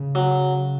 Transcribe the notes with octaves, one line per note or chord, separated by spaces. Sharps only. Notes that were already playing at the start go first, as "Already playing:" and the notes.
Already playing: C#3
F#3